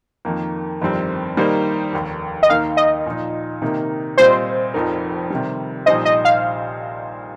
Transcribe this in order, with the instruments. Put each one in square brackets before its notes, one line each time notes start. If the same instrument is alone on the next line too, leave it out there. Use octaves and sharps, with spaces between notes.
[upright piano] F2 D#3 A#3 D#4
G1 F2 D#3 G3 C4
D#3 G3 A#3 D#4 C5
F1 D#2 D#3
[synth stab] D#5
[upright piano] D#2 D#3 A#3 D#4 A#4 [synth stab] F5
[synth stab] D#5
[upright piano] A#2 F3 D#4
C3 D#3 A#3 D#4 A#4
[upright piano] A#2 G3 C4 F4 D#5 [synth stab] C5
[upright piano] F1 F2 F3 D#4 A#4
C3 D#3 G3
[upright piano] A#1 A#2 G3 D#4 C5 [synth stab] D#5
[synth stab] D#5
F5